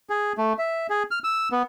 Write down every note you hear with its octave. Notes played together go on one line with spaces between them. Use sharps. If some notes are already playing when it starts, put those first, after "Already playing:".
G#4
A3
E5
G#4
F6
E6
B3